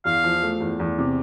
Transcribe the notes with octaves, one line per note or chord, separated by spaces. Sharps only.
E2 F5
F3
A3
E2
E2
C3